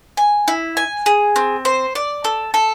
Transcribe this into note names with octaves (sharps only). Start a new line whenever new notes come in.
G#5
E4
G#5
G#4
C4
C5
D5
A4
A4